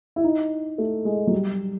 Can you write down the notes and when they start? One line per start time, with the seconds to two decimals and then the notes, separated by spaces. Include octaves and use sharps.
0.16 E4
0.24 D#4
0.78 A3
1.05 G#3
1.27 F#3
1.33 G3